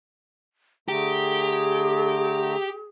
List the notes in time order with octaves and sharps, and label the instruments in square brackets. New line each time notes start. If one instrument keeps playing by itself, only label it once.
[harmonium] D3 A3 A#5 [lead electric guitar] G4 [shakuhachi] G#4